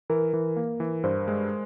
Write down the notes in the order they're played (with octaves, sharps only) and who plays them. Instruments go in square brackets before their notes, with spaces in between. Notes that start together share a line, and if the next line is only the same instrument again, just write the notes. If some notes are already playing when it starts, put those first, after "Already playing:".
[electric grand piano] E3 [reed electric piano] A#4
[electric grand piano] E3
A#3
E3
[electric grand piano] G2 [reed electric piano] C5
[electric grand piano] G#3